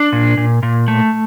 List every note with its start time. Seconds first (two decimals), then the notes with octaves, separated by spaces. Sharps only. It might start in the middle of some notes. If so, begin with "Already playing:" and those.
Already playing: D4
0.12 A#2
0.37 A#2
0.63 A#2
0.88 A3